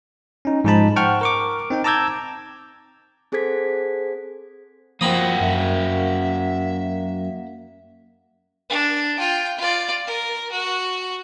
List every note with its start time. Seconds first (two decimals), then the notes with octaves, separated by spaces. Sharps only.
0.45 C#4 D#4
0.64 G#2 F3 D#4 G#4 A5 B5
0.96 C5 F#5 G5 A5 C#6 F6
1.21 A#4 C#6 D6
1.70 C4 D#4 G5
1.84 A5 A#5 D6 E6 G6 G#6
3.32 C4 G#4 A4 C5 G#6 B6
5.01 F3 A#3 C4 F#4 B5 D#6
5.41 F#2 E5
8.70 D4
9.17 F4 G5
9.59 F4 D5
10.07 A#4
10.52 F#4